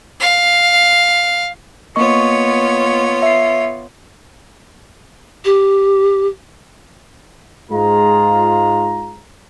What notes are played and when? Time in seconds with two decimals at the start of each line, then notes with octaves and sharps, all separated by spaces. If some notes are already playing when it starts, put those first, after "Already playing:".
0.20 F5
1.96 A#3 B3 F4 C#5 D#5 C#6
3.22 E5 C7
5.44 G4
7.70 G#2 G#3 F4 A#5